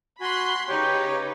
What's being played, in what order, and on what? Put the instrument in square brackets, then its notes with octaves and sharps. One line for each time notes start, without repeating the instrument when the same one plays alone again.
[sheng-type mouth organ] F#4 G#5 [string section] B5 C6 F#6
[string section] C#3 D#4 B4 [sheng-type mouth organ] G4 C#5 G5